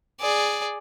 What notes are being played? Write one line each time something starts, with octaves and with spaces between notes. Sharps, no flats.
G#4 D5